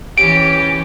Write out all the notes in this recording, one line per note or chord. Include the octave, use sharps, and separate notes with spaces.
E3 C#4 G4 D7